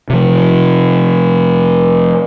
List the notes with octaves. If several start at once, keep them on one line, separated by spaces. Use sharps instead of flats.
C3 F3